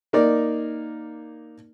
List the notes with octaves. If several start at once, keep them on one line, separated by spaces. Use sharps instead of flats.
A#3 D#4 A#4 D5